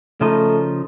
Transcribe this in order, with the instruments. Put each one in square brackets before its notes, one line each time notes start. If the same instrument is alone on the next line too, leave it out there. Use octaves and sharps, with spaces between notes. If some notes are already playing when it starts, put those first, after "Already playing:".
[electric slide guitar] C#3 F3 D#4 [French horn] A3